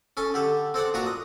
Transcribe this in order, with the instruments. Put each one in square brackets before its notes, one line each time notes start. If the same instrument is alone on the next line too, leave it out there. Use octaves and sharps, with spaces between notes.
[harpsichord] C#4 A4 G#5 A5
D3 G4 A4
C4 A4 D5 F#5
A#2 D4 F#4 A#5 C#6
D#5